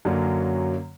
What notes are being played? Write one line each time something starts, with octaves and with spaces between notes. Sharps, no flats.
F#2 D3 F#3 A#3 C#4